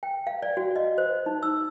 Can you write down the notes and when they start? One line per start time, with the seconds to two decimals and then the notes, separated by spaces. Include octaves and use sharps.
0.03 G5
0.27 F5
0.42 D5
0.57 F#4
0.76 D#5
0.98 C5
1.26 D#4
1.43 E6